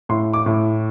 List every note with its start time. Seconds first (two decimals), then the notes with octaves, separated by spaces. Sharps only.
0.09 A2 C6
0.34 D6
0.46 A2